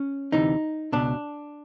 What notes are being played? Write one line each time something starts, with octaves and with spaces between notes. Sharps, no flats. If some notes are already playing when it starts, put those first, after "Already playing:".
Already playing: C#4
D2 C3 E3 D#4
C#2 B2 D4